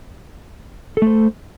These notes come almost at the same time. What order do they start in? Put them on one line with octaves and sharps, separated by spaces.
A4 A3 C5